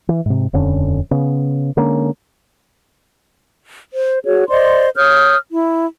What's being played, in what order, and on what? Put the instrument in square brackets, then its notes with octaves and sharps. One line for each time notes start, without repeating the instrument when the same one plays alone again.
[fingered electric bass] E3
G#2 C3
D#1 F2 D3 C#4
C#3 B3
D3 G#3 A#3 C#4
[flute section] C5
F#4 G#4 C#5
C5 D5 D#5 C6
C#5 D#6 F6 G6
E4